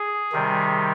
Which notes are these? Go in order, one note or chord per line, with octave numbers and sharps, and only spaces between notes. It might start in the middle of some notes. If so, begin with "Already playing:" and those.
Already playing: G#4
C3 D#3 G3